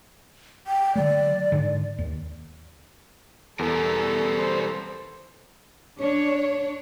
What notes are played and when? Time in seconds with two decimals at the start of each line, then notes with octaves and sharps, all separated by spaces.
0.67 G5
0.96 D3 F#3 A3 D5
1.52 G#2 D3
1.99 D#2
3.59 E2 G3 A4 A#4
4.39 C5
6.00 D4 C#5